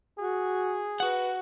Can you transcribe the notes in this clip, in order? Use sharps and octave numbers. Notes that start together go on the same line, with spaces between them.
F#4 G#4
F#4 B4 F#5